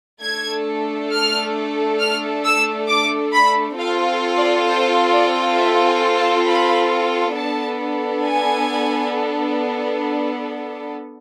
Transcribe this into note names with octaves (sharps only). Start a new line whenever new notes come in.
A3 D4 A4 G#6
F6
F6
E6
D6
B5
C4 F4 A4 F5
D5
C5
D5
E5
G#5
A5
B5
B3 D4 A4 A5
G#5